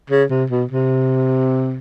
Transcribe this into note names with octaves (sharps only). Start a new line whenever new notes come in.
C#3
C3
B2
C3